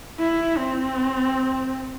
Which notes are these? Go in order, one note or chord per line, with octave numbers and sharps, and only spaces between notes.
E4
C4